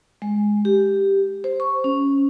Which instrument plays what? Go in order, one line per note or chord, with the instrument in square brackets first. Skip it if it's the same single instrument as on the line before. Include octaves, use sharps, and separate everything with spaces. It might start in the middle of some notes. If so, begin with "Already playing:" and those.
[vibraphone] G#3
G4
C5
C#6
C#4